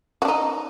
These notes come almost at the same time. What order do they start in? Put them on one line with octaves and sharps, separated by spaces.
F#4 D4 D#4